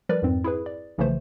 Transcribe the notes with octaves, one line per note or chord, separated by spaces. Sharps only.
F3 G3 A#4 B4 D5
F2 G#2 C4
E4 G#4 B4
D5
B1 C#3 E3 F3 A3 C5